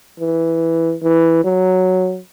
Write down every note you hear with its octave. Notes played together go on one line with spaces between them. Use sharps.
E3
E3
F#3